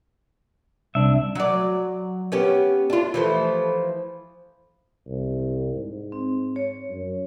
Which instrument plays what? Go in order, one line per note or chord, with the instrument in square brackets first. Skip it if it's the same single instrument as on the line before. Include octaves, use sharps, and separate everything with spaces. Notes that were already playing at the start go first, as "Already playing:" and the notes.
[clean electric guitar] C2 D4 [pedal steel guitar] E5
[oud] F#3 D5
B3 C#4 G4
D4 F4
E3 F3 A3
[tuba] C2
G#2
[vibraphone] C4
C#5
[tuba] F#2